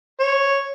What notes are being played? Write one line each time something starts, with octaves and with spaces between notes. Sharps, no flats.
C#5